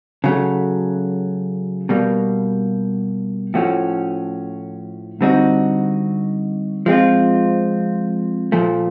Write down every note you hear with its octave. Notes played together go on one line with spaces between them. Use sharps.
C#3 F#3 A3
B2 G3 A#3
A2 F3 A3 C#4 F#4
D3 G3 C4 D#4 F#4
F3 G#3 C4 F4
A#2 F3 A3